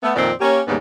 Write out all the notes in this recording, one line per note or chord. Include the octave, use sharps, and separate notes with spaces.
A3 B3
F2 A#2 D#3 C4 D5
A#3 C#4 G4
D#2 G#2 C#3 G3 A#3 B3